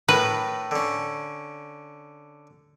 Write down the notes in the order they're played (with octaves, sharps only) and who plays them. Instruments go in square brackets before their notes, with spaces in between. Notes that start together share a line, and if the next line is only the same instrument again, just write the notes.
[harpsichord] A2 A#4 [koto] B4
[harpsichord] D3 C#4